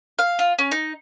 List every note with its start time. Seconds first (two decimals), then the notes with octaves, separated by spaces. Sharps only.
0.19 F5
0.39 F4
0.59 C#4
0.71 D#4